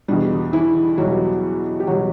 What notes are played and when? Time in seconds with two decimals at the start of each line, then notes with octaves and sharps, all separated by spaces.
0.08 E2 B2 G3 D4
0.53 E3 E4
0.98 E2 B2 F#3 G3 F#4
1.80 G4
1.87 E2 B2 F#3 G3 F#4